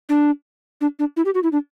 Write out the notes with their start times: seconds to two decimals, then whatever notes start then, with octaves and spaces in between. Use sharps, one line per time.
0.09 D4
0.81 D4
0.99 D4
1.17 E4
1.25 G4
1.35 F#4
1.43 E4
1.52 D4